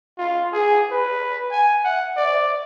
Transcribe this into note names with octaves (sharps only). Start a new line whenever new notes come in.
F4
G#4
B4
G#5
F#5
D5